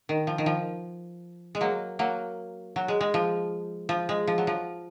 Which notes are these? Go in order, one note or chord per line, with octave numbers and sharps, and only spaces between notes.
D#3
F3
D#3
F3
G#3
F#3 A#3
F#3 A#3
F#3
G#3
G#3
F3
F3
G#3
F3
F#3
F3